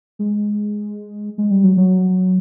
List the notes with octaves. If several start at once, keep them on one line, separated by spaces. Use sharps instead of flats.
G#3
G#3
G3
F#3
F#3